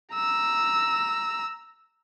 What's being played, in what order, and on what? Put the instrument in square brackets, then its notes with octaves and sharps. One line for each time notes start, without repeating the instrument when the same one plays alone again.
[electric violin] A#5 E6